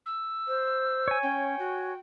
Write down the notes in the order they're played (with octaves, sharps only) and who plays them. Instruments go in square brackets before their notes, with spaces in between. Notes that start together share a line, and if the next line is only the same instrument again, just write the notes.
[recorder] E6
[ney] C5
[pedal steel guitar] C#5 G#5
[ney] C#4 [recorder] G5
[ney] F#4